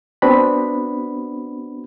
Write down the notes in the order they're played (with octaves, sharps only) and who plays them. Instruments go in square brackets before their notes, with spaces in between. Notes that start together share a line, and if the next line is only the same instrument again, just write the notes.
[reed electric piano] B3 C4 D4 F#4 B5